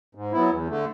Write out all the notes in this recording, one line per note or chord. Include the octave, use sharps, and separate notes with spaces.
G#2
F#3 B3 E4
E2
D3 A3